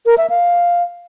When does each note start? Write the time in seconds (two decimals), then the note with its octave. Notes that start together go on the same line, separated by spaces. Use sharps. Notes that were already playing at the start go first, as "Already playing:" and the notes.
0.06 A#4
0.18 E5
0.30 F5